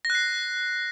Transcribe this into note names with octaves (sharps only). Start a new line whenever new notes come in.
A#6
F#6
C7